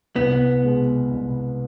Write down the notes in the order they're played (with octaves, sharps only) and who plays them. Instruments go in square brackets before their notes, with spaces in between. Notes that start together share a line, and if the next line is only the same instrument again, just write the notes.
[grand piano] C2 [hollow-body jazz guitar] B3
[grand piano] B2 G#3
C2